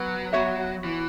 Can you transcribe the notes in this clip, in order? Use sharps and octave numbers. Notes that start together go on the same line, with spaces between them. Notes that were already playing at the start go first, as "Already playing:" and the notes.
Already playing: F#3 B3
B3 F#4 C#5 E5
E3